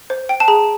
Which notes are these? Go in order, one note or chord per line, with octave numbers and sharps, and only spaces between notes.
C5
G5
A5
G#4 A#5